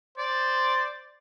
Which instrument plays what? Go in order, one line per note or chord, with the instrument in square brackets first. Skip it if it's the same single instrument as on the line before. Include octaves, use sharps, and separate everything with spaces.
[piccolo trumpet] C5 [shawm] D5